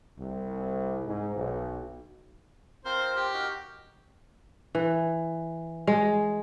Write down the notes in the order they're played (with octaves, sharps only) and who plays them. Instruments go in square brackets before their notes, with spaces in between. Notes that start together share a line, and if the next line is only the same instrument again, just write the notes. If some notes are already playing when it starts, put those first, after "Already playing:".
[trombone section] C2
G#2
B1
[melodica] C4 F4 A#4 [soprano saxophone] C5
[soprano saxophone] G4
[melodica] D#4 F#4 A#4
[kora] E3
G#3